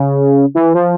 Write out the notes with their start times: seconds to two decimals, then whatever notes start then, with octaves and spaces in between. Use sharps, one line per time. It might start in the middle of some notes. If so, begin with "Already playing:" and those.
Already playing: C#3
0.55 E3
0.75 F3